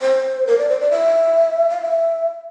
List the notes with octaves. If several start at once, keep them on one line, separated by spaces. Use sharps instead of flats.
C5
A#4
D5
C5
D5
E5
F5
E5